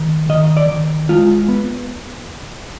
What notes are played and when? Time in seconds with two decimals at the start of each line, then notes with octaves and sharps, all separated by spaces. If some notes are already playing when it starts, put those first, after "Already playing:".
Already playing: D#3
0.29 D#3 D#5
0.57 D5
0.69 D#3
1.09 G#3 F4
1.48 B3